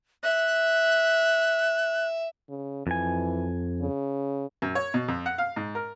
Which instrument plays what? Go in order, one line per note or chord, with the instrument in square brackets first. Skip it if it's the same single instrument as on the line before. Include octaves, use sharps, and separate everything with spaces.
[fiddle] E5 [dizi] F#6
[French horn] C#3
[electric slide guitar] F2 G#5 [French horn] E3
[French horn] C#3
[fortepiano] F#2
C#5
B2
F2
F#5
F5
G#2
A#4